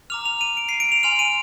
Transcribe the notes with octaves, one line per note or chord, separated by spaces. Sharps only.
A#5 D6 F6 F7
F7
D#7
D7
C7
D7
F7
G#5 C6 F6 F7
D#7